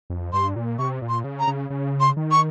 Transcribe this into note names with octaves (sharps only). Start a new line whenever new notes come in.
F2
G2 C6
A#2
C3 C#6
A#2
C6
C#3
A#5
C#3
C#3
C6
D#3
C#6